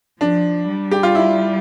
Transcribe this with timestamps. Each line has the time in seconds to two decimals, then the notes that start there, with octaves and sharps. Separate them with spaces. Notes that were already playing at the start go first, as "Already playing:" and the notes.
0.21 F3 D4
0.68 G3
0.91 G4
1.03 F4
1.15 E4